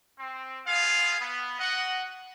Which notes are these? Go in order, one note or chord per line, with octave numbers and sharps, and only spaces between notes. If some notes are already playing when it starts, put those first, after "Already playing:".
C4
B3 F4 G#4 F5
B3
F#4 D#5 F#5